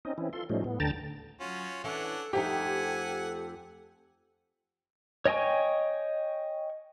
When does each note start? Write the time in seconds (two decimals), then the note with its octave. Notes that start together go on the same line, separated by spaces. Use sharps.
0.05 C4 C#4 D#4 D#5
0.18 E3 C4 C#4 E4
0.33 F4 A4 C6
0.50 A2 F3 G3 A3 C#4 D#4
0.64 A2 B3
0.80 D2 D3 G5 A5 A#5 A6
1.40 F#3 C#4 F4 F#4
1.84 E3 C#4 D4 A4 F#5
2.33 F2 A3 D#4 G4 A4 F#5 G#5
5.25 C#5 D#5 G5 G#5 C#6